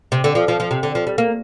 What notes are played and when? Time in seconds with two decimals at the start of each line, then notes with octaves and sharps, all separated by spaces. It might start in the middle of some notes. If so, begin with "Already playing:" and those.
0.12 C3
0.24 D3
0.35 F3
0.48 F3
0.60 F3
0.71 C3
0.83 D3
0.95 F3
1.07 G3
1.18 A#3